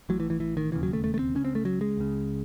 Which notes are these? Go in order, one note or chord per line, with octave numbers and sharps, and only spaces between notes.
A1 A2 F#3
E3
E3
E3
D#3
E1 D#2 C#3 E3
F#3
A3
A3
A3
C4
C#2 C#3 C#4
C4
A3
F#3
G#3
C#2 C#3